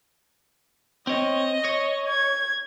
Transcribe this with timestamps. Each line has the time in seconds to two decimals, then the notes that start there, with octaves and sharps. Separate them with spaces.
1.07 C4 C#5 D#5
1.65 C#5
2.08 G#6